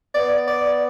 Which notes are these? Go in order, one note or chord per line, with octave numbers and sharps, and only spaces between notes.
B3 D5
D5